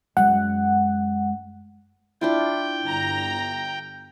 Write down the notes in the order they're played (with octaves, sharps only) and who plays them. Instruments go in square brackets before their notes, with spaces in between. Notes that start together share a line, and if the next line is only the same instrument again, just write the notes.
[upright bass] F#2 G#3 [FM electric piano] F#5
[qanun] D4 E4 F4 [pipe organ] G5
[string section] G1 A#5